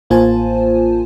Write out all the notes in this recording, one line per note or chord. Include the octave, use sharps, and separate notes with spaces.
A1 A#3 F4 C5 G#5 A5